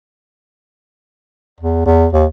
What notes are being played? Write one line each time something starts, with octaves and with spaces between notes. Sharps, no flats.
E2
E2
D#2